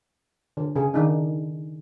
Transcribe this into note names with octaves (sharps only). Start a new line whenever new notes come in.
D3
C#3 G#4
D#3 D4 D#4